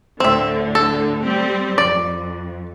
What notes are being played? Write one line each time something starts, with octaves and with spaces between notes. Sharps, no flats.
D2 A2 D3 C4 E5
A4
G3 C4 G4
F2 D5